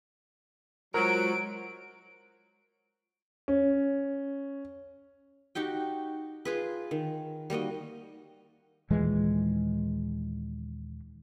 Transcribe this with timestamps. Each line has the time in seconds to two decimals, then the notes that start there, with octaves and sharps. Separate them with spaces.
0.94 F#3 G#3 F4 A#4 C5 D7
3.48 C#4
5.55 D#4 F#4 G4 G5
6.45 F4 G#4 B4
6.91 D#3
7.50 G3 A#3 F#4 D#5
8.90 D#2 A#2 E3 G#3